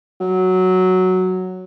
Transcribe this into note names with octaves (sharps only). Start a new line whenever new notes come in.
F#3